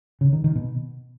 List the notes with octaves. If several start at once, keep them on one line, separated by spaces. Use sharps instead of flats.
C#3
D#3
D#3
B2